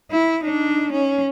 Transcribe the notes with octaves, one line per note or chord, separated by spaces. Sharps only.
E4
D4 D#4
C#4